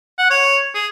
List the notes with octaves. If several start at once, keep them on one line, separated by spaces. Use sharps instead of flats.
F#5
C#5
G#4